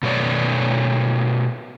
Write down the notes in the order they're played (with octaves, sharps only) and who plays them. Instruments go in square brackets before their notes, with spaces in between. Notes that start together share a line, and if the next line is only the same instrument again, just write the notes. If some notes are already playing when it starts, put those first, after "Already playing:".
[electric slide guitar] B2 A3 C#5 D5